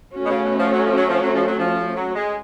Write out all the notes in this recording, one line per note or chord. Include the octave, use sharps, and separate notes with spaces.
A3 C#4 F#4
B2
C#3
B2
F3
F#3
F3
F#3
F3
F#3
F3
F#3
F3
F#3
G#3